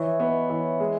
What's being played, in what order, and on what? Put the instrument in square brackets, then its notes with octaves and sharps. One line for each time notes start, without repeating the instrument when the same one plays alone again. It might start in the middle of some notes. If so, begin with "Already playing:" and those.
Already playing: [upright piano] E3 [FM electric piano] C#5 D#5 E5
[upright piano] B3
E3
G#3